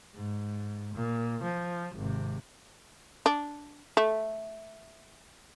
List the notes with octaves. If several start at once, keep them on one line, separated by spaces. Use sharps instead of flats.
G#2
A#2
F3
G#1 C3
D4
A3